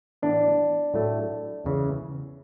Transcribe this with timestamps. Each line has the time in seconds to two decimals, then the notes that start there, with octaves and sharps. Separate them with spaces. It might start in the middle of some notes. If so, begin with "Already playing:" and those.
0.22 A2 E3 B3 D4
0.94 A2 F#3 A3
1.64 E2 C#3 E3